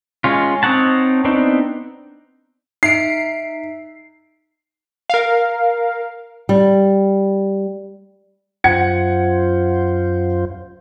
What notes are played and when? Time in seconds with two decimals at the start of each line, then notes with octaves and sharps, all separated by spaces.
0.24 G#3 C#4 F4
0.63 C4 D#4 C#5 F#5 A5
1.25 B3 C4 D4 D#4
2.83 D#4 E5 C7 D7
5.10 A#4 F5
6.49 G3
8.64 F#2 F4 C5 F#5 G#6 C#7